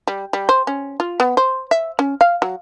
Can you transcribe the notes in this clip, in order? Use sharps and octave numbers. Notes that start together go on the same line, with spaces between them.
G3
G3
C5
C#4
F4
B3
C5
E5
C#4
F5
F#3